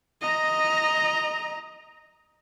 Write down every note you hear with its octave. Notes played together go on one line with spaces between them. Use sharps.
D#5 A#5